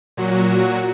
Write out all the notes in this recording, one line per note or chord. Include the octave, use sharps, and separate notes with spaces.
A#2 F#3 F#4